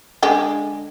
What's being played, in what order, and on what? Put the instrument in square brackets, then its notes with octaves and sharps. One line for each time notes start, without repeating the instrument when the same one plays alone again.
[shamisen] D3 G#3 G5